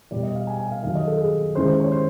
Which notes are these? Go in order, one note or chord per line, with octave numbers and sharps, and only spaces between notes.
E2 B2 G3 D5
D#5
F5
G#5
G#5
F5
D#2 D#3 F#3 F5
D#5
A4
G#4
D#2 C#3 E3 G#3 C5
C5
C#5
C5